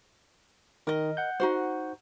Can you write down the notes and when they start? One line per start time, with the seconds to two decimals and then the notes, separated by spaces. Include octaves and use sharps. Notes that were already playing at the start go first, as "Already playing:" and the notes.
0.87 D#3 A#4 D#5
1.17 F#5 G6
1.40 D#4 F#4 C5